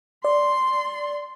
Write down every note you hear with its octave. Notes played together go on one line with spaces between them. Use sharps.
D5 C6